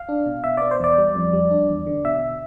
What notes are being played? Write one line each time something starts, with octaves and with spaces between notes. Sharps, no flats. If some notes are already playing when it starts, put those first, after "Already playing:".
Already playing: F5
D4
B2
B2 E5
B3 D5
C5
E2 D5
G3
F2
G3
D4
E2
D3
B2 E5